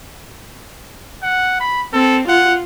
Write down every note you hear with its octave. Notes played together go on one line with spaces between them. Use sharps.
F#5
B5
C4 A4
F4 F#5